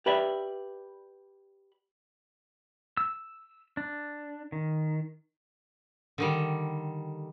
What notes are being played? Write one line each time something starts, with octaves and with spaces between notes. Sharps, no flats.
G4 B4 D5 E5
E6
D4
D#3
D3 D#3 G3